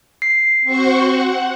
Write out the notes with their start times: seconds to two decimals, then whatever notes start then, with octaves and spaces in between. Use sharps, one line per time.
0.22 C7
0.65 C4 F#4 C5 C#6
1.02 F#5